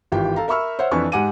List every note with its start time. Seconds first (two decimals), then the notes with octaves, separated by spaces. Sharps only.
0.12 G#1 E3 F4 G4 G5
0.36 A4 F5 A#5
0.48 A#4 E5 B5 C#6 E6 F6
0.79 C5 C#5 E5 F#5
0.91 F2 E3 D4 B4 G#5 C#6
1.12 G#2 G4 F#5 G#5 D6 D#7